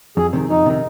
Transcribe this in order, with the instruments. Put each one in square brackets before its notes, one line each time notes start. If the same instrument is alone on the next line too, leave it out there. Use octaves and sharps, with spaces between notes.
[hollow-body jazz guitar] F2 [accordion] G#4
[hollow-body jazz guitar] C3 D#3
[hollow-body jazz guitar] F2 [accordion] D#4
[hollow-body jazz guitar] C3 D#3